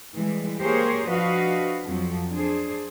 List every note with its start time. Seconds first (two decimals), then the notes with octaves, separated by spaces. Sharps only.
0.16 E3 G3 G#3
0.60 A#3 G4 G#4 A#4 C5 C#5
1.07 F3 D4 F#4 B4 D#5 F5
1.85 F2 F3 F#3
2.31 D4 G#4 C5